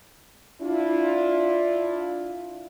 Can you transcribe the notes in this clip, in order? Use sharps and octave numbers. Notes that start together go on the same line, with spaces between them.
D4 E4 F4